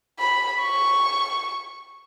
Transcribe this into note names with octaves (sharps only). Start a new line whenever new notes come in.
B5
C#6